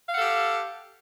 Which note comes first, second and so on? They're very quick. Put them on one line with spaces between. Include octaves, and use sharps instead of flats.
F5 F#5 A4 G4